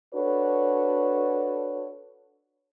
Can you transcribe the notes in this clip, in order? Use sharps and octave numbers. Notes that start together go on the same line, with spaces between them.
D4 F#4 A4 B4 C#5